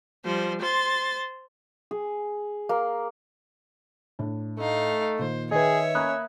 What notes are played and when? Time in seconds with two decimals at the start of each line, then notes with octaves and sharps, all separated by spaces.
0.25 F3 G3 C5
0.62 C5 C6 A6
1.91 G#4
2.69 A#3
4.19 A2 D4
4.58 A3 D#4 F5
5.19 A#2 D#3 C5
5.52 D#3 G#4 B4 C#5 D#5 E5 G5
5.95 A#3 C#4 A#5 B5 D#6 F#6 G#6